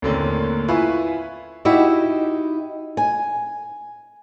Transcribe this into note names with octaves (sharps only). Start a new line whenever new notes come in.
D#2 A2 D3 A#3 C4 C#4
E4 F4 B4 F5 G#5 C#6
D#4 E4 F#4 G4
G#5